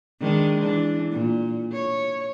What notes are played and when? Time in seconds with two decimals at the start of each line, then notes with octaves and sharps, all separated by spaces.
0.20 D#3 G#3 D4
0.60 E3 D4
1.12 A#2
1.72 C#5